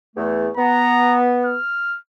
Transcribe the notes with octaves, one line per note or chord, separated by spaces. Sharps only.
E2 A3
B3 A#5
F6